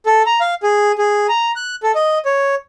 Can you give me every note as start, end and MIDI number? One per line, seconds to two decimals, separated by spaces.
0.06 0.23 69
0.26 0.40 82
0.41 0.54 77
0.63 0.92 68
0.98 1.27 68
1.29 1.52 82
1.56 1.75 90
1.83 1.92 69
1.95 2.18 75
2.25 2.55 73